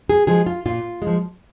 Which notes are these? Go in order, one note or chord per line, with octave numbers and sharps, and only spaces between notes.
G#4
F3 G#3 G#4
F4
A#2 F4
G#3
F3